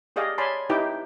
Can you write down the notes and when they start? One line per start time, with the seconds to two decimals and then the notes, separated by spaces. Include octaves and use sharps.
0.16 G4 G#4 D5 D#5 F5
0.38 C#5 D5 G#5 A5 B5 C6
0.70 D#4 E4 G4 B4 G5 D6